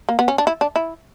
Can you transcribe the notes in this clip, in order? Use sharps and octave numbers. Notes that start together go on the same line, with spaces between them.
A#3
B3
C#4
D4
E4
D4
E4